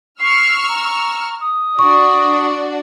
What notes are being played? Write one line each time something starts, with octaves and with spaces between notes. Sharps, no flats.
C#6 E6 F6 C7
A#5
D#6
D4 F#4 D5 C#6